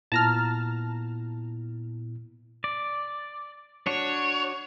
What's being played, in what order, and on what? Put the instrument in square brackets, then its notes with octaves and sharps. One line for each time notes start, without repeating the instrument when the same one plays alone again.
[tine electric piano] A#2 B3 E4 [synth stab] A5 A#5 F6
[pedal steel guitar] D5
[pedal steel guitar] D4 F#4 [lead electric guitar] C#5